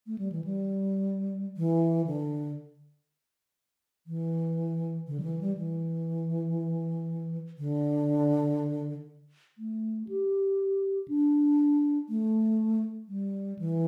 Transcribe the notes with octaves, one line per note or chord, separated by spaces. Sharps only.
A3
G3
E3
G3
E3
D3
E3
D3
G3
E3
G3
E3
D3
A3
G4
D4
A3
G3
E3